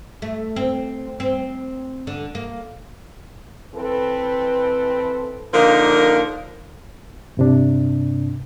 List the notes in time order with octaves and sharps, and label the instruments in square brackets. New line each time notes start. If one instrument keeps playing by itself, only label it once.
[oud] A3
C4
C4
D3
A#3
[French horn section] E3 C4 A4 B4
[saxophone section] D3 F3 A#3 D#4 A#4
[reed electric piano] G2 C3 D4